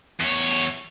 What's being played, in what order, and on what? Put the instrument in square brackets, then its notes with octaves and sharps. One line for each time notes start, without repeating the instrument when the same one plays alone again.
[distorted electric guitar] E2 C#5